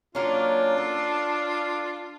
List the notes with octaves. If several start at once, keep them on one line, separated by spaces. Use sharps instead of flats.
F#3 A#3 C#4 D4 F4
A4